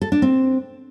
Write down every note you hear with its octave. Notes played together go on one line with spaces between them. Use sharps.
A4
D4
C4